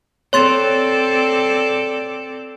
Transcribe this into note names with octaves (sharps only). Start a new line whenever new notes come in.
C4 A4 C#5 D5 C6 A6